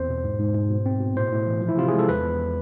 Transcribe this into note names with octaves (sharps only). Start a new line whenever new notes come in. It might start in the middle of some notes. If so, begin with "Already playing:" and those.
Already playing: E2 C4 C5
B2
G#2
G#2
G#2
B2
C4
B2
A2 C5
A2
E3
F3
E4
C3 F4
G#4
G#3
A4
E2 B4
E2